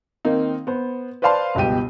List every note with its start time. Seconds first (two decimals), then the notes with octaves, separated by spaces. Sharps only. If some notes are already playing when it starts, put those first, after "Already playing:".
0.25 D#3 A#3 C4 D#4
0.67 B3 C5
1.22 B4 C5 D5 F5 A5 C6
1.55 G1 C#2 B2 G4 D#7